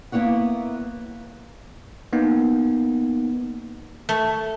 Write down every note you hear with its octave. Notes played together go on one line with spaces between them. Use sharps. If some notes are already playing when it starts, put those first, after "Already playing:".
A#3 B3 E4 C#5 F#5
A#3 B3 D#4
A3